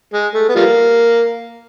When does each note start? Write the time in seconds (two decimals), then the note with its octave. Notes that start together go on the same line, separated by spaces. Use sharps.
0.13 G#3
0.34 A3
0.49 B3
0.55 F3 G3 A#3